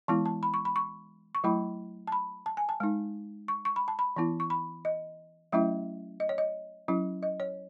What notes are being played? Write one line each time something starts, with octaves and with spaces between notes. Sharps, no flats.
E3 G#3 B3 E4 A5
A5
B5
C#6
B5
C#6
C#6
F#3 A3 E4 B5
A5
B5
A5
G#5
A5
G#3 D#4
C#6
C#6
B5
A5
B5
E3 B3 E4
C#6
B5
D#5
F#3 A3 C#4 E4 E5
D#5
C#5
D#5
F#3 C#4 E4
D#5
C#5